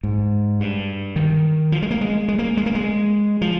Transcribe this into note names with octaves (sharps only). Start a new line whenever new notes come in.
G#2
G2
D#3
F3
G#3
A#3
G#3
G#3
A#3
G#3
A#3
G#3
F3